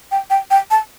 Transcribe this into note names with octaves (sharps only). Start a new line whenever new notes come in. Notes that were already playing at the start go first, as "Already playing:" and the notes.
G5
G5
G5
A5